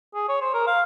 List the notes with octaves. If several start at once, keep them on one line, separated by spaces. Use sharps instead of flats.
G#4
C#5
C5
A#4
F5